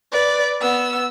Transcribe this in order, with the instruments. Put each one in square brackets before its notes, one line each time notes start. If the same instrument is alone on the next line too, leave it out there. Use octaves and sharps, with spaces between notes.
[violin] B4 D5
B3 E6